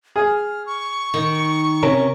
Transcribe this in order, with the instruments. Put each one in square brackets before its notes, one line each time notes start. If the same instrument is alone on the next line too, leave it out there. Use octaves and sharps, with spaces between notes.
[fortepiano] G#4 [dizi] F6
[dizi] C#6
[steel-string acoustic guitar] D#3
[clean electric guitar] C3 C#4 A#4